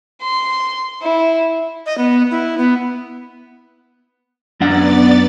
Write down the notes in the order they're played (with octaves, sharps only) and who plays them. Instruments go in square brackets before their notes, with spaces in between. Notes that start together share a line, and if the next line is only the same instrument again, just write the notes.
[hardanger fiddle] C6
E4
[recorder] D#5
B3
E4
B3
[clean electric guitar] F#2 D4 F#5 [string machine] B3 D5 A6